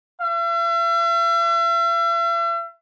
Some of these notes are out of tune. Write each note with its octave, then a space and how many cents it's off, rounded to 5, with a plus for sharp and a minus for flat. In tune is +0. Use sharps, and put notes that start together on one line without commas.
E5 +45